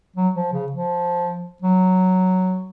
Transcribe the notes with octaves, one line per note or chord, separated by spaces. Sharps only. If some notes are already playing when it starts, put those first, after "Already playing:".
F#3
F3
C#3
F3
F#3